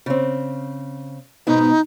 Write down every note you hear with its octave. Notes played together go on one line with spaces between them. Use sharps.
C#3 C4
G#2 B2 B3 D#4